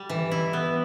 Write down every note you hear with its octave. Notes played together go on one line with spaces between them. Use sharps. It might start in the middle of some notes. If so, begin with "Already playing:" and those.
Already playing: G3
E3
E4
B3